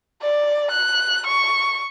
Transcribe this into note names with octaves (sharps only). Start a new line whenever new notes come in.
D5
F#6
C#6